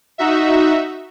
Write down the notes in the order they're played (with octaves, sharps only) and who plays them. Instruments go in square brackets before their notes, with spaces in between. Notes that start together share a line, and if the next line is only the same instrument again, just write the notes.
[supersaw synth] D#4 F#4 E5